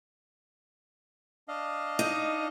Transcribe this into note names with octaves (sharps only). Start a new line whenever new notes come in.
D4 D#5 F5
D#4